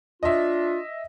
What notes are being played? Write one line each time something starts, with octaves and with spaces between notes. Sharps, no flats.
D4 F4 D#5 E5